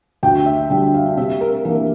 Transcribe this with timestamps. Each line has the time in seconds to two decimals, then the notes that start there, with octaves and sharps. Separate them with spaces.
0.23 D2 G5
0.46 E5
0.70 D3 G3 D4 G5
0.94 F5
1.17 C3 E5
1.41 A#4
1.65 E3 A#3 D4 A#4